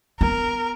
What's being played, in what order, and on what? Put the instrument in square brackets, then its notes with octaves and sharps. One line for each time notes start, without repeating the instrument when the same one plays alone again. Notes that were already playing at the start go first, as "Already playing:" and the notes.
[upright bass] B3 [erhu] A#4